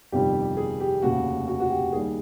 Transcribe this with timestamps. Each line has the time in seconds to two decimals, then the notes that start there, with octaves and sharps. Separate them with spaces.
0.12 G1 F2 C3 D#3 G3 G4
0.57 G#4
0.80 G4
1.02 F1 D#2 C#3 F#4
1.47 F#4
1.60 F#4
1.70 G4
1.92 D#2 D#3 G3 G#4